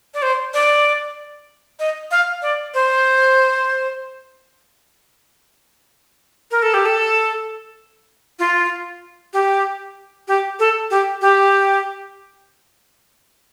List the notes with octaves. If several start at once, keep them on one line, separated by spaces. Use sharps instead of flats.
D5
C5
D5
D#5
F5
D5
C5
A#4
A4
G4
A4
F4
G4
G4
A4
G4
G4